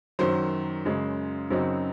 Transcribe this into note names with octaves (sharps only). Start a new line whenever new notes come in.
F#2 D#3 F#3 C5 C6
F#2 C#3 G#3
F#2 C#3 F#3 C4 D#4